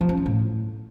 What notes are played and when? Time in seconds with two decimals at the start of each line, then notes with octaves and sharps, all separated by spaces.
0.01 F3
0.09 C#4
0.17 F#3
0.26 A2